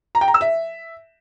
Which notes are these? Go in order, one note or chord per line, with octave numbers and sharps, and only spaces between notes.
A#5
G5
A#5
E6
E5